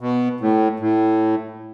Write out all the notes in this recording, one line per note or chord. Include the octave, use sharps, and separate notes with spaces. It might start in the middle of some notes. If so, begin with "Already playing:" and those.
B2
A2
A2